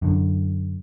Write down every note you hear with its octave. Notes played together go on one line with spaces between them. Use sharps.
F#2 D3